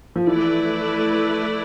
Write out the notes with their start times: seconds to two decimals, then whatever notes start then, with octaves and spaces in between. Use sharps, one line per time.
0.16 F3
0.27 E3 A3 E4 B4 D5